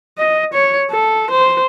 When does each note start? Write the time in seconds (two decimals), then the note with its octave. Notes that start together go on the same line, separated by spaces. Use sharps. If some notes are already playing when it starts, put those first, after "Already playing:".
0.18 D#5
0.54 C#5
0.91 A4
1.31 C5